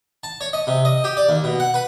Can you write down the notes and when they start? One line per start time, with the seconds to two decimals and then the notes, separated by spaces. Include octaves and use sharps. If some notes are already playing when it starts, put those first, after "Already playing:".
0.23 A5
0.41 C#5
0.53 D#5
0.67 C3
0.85 D#5
1.04 G4
1.17 D5
1.29 D#2
1.44 B2
1.60 F#5
1.74 B4